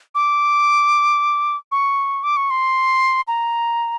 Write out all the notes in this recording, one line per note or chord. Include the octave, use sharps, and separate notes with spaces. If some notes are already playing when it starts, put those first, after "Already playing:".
D6
C#6
D6
C#6
C6
A#5